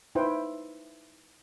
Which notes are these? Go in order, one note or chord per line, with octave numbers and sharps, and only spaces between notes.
D#4 E4 B4 C5 G5